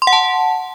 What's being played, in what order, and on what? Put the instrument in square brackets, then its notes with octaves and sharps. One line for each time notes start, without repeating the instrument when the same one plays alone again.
[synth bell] C6
F#5
A5